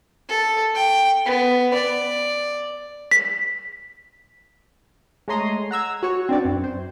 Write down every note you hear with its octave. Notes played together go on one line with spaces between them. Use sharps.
A4
G5
B3
D5
B6
G#3 A3 C#5 A#5 C6 D#6
F#5 A#5 E6 G#6
F#4 C#5
C4 D4 B4 D5
F#2
C5